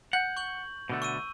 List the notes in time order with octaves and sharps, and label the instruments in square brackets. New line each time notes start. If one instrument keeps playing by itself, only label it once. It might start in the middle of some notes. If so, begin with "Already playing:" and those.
[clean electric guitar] F#5 [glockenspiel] G6
[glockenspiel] C#6 G6 F#7
[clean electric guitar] B2 D3 A3
[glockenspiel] C#6 E6 D#7